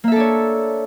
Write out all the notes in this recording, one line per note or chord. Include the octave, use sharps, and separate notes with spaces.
A#3 D4 A4 C#5 E5